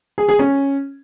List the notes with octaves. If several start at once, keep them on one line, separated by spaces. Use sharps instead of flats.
G#4
G#4
C#4